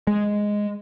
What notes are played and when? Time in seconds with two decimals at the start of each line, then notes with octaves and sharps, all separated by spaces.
0.07 G#3